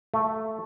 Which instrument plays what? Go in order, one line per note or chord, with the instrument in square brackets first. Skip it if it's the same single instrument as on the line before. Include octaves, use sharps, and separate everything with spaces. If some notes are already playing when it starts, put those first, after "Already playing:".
[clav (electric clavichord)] A3